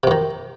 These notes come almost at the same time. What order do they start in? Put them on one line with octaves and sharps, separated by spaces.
C3 F#2 D#3